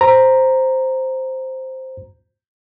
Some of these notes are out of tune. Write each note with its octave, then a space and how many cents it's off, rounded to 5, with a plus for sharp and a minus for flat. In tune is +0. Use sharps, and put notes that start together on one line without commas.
C5 +0 A#5 +0